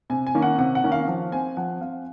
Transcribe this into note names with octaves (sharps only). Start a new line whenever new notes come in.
C3 G#5
G#5
D#3 A#3 C#4
F#5
C3 F#5
F#5
D#3 A#3 C#4
F5
F3
C4 G#5
F3 F#5
C4 F5